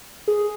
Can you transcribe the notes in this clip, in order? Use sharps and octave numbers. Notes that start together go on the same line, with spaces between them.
G#4